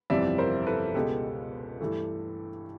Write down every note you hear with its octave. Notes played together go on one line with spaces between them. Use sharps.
G1 F2 C3 E3 G3 D5 E5
A#4 C5
A4 B4
C#2 B2 G#3 B3 G4 A4
G2 E3 A3